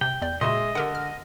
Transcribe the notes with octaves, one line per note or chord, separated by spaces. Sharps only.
C3 G5
E2 D5
A#2 C#3 G#3 F#4 D#5 E5 C6
D3 G4 A#4 F#5
F6